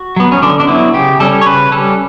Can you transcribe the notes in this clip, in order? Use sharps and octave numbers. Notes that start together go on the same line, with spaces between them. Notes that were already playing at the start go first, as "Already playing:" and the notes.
Already playing: F#4
F#3 B3
C#4
D3 D4
D4
F#3 B3 E4
C#3 G4
G3 C#4 A4
C#5
C#3 B4
G3 C#4 A4